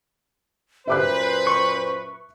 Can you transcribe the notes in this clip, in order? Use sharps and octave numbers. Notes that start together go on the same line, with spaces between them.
F#2 A#2 B4 C5 E5 D6 F#6
C#6